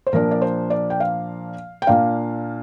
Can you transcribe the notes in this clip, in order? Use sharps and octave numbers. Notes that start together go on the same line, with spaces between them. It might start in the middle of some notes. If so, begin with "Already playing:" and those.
C5
A#2 F3 A#3 D4 A#4
D5
C5
D5
G5
F5
G5
A#2 A#3 D4 F5